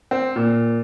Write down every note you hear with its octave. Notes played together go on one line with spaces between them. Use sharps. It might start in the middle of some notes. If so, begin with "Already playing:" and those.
C4
A#2